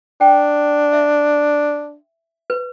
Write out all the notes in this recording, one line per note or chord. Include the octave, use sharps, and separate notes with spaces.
D4 G5
E5
B4